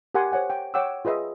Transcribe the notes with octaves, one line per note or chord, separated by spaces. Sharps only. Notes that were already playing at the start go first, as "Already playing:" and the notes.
G4 A#4 F#5 G#5 C6
C5 C#5 F#5 G#5
G5
C#5 F#5 G5 D6 E6
F4 G#4 B4 D#5 E5